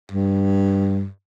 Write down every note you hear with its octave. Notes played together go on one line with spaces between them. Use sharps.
G2